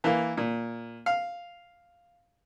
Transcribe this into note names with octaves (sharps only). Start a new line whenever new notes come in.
E3 A#3
A#2
F5